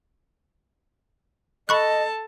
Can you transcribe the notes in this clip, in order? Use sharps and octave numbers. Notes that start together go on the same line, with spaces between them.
A4 D#5 A5 B5 C#6 F#6